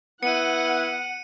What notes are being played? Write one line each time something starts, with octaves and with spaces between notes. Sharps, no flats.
B3 E4 F#5 C#7 D#7